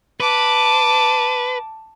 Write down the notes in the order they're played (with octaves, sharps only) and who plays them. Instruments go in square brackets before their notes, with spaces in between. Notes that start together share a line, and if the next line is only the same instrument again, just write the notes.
[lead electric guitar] B4 [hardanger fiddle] A5 D6